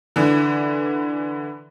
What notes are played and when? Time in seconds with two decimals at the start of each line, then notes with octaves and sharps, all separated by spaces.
0.16 D3 E3